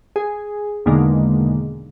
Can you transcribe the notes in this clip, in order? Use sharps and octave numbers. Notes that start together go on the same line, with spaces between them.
G#4
E2 B2 D3 D#3 G#3 A#3